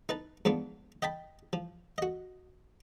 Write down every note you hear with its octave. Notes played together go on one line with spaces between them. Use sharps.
D#4 B4 A5
G#2 F3 B3 D4
D#5 G5 A5 B5
F3
F#4 D#5